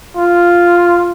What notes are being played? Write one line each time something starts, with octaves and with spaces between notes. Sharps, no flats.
F4